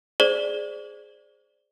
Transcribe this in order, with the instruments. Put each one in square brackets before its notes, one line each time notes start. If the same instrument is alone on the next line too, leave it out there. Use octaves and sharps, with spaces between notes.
[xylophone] G#4 C5 D5 F#7